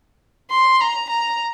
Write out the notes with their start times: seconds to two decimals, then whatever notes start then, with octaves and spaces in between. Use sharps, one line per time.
0.51 C6
0.81 A#5
1.10 A#5